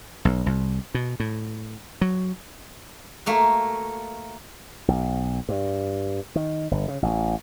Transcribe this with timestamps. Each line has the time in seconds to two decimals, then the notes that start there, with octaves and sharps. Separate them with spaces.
0.25 B1
0.46 C2
0.94 B2
1.20 A2
2.01 F#3
3.26 A3 A#3 F#4
4.88 B1
5.49 G2
6.36 D#3
6.71 G1
6.88 C#3
7.02 A1